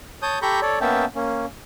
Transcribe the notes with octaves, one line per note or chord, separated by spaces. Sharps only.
C#5 A5 D#6 G6
G4 A4 A#5 B5 C#6 G6
A4 C#5 D5
A#3 B3 C#4 E5 G5 A5
A#3 C#4